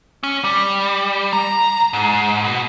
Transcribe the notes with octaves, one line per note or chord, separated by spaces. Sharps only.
C#4
G3
C#2 A#5
G#2
B2